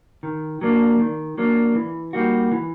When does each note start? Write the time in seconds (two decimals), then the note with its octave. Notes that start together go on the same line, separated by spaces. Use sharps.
0.23 D#3
0.61 F#3 A#3 D4
0.99 D#3
1.38 F#3 A#3 D4
1.75 E3
2.13 G3 A#3 D#4 F#4
2.51 E3